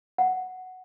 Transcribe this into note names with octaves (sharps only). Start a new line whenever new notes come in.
F#5